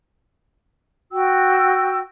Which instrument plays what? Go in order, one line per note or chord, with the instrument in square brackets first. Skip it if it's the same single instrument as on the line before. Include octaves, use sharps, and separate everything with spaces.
[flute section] F#4 G5 E6